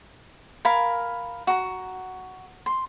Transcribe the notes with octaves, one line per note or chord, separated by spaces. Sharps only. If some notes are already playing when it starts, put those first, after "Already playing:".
A#4 F5 G#5 B5
F#4 A#5
C6